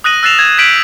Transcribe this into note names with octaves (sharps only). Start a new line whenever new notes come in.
D#6 F#6 A#6 D#7 F#7
E6 F#6 A6 C7 E7 F7
G#6
G6 B6 D7 D#7 F#7